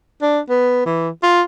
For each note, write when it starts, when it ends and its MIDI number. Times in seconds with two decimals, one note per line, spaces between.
0.22 0.39 62
0.50 0.86 59
0.86 1.09 52
1.23 1.41 65